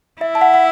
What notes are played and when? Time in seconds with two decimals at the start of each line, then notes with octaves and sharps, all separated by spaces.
0.21 E4 E5
0.35 A5
0.41 F#5
0.54 F#5